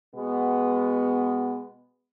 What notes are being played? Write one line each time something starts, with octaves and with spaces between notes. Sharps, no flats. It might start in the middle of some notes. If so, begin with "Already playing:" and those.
B2 G#3 B3